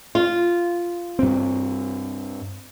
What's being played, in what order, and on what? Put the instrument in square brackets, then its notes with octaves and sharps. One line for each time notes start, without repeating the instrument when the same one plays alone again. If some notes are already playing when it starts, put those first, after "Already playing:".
[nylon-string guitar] F4
[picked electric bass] G2 C4